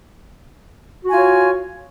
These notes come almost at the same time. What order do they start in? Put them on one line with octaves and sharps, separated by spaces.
F#4 G#5 F4 C#5